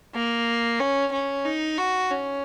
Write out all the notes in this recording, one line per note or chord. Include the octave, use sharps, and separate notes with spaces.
A#3
C#4
C#4
D#4
F#4
C#4